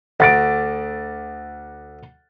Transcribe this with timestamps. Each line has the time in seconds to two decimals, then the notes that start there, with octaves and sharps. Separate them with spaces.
0.20 D2 F#5 A6 D7